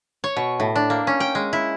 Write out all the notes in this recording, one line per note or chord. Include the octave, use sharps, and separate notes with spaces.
C#5
B2
A2
D4
A#3
C#4
G5
G#3
E4